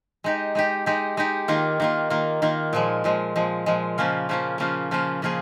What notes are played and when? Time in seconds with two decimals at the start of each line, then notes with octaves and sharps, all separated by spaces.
0.24 G#3 D#4 G4
0.55 G#3 D#4 G4
0.86 G#3 D#4 G4
1.17 G#3 D#4 G4
1.48 D#3 A#3 F4
1.80 D#3 A#3 F4
2.10 D#3 A#3 F4
2.42 D#3 A#3 F4
2.73 A#2 F3 G#3
3.04 A#2 F3 G#3
3.36 A#2 F3 G#3
3.66 A#2 F3 G#3
3.98 C#3 F3 A#3 C#4 F4
4.29 C#3 F3 A#3 C#4 F4
4.58 C#3 F3 A#3 C#4 F4
4.91 C#3 F3 A#3 C#4 F4
5.22 C#3 F3 A#3 F4 G#4